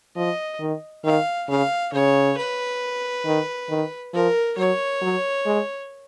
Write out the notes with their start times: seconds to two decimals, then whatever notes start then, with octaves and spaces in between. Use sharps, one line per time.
0.16 F3 D#5
0.60 D#3
1.04 D#3 F5
1.49 C#3 F5
1.93 C#3 C#5
2.37 B4
3.26 D#3
3.69 D#3
4.14 F3 A#4
4.58 F#3 C#5
5.02 F#3
5.46 G#3